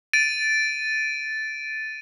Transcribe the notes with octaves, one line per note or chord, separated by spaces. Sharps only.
A6 D7 D#7